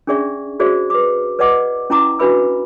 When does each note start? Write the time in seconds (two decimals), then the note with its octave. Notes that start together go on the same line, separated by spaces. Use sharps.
0.07 C#4 D4 G#4 D5 E5 C#6
0.60 F#4 G#4 C5 D5 E5
0.90 B4 D6
1.39 B4 D5 D#5 F#5 D6
1.90 C#4 E4 A#5 D6
2.19 D4 F#4 B4 E5 B5 E6